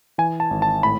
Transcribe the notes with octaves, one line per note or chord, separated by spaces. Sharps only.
E3 G#5
A5
G#1
A5
A2 B5